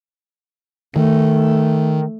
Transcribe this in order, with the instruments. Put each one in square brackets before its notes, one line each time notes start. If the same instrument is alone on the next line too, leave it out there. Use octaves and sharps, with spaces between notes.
[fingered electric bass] D#3 [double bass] A3